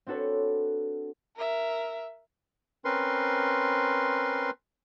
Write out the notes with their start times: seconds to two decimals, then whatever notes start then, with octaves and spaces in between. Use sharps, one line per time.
0.07 C4 D4 F#4 A4 B4 C#5
1.36 A#4 E5
2.85 C4 C#4 A#4 B4 C6